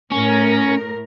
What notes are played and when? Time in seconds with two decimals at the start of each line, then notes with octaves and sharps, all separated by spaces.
0.11 A2 C#4 A#4